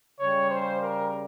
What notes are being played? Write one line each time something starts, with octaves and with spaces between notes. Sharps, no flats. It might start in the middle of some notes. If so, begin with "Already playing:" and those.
C#3 G3 C#5
C5
A#4